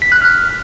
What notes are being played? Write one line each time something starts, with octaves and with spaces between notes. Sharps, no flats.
B6
F#6
F6